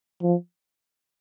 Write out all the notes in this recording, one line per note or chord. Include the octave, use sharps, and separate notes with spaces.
F3